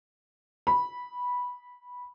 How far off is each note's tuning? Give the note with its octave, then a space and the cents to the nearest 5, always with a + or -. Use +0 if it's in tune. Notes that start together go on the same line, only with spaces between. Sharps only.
B5 -10